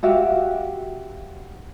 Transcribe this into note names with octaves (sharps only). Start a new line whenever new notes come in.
F#4 G4 E5 F5